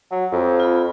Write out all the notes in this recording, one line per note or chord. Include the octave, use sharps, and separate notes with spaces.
F#3
F2
F4 B5